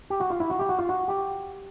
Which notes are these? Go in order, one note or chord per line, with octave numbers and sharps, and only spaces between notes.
G4
F#4
F4
E4
F#4
G4
F#4
F4
F#4
G4